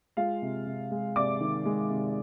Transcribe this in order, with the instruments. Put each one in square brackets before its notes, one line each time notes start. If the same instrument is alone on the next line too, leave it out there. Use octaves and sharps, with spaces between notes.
[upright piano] G#3 F4 F5
C3
C3
G#3
C3 D5 D6
D#3
G#3
C3